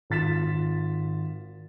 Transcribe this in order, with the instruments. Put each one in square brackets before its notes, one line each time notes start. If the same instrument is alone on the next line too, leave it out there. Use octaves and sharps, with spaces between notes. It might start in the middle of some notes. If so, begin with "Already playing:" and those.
[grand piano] G#1 F4 A6 B6 E7